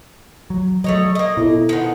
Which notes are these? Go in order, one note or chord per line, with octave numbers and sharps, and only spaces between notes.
F#3
F#3 A3 C#5 D#5
A#3 D#5
B2 E4 A4
D#3 F3 B3